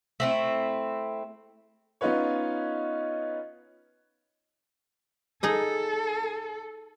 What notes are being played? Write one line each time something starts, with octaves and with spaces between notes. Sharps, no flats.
A3 C4 E4
B3 C#4 D#4 F4 B4 C#5
D#4 G#4 A4 D#5